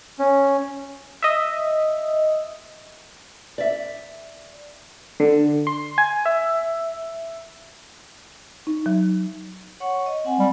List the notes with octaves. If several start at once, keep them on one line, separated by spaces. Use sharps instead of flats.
C#4
D#5 E5
D5 E5
D3
C6
G#5
E5
D#4
F#3
C#5 F#5 C#6
D#5
C4 F#5 G#5
G3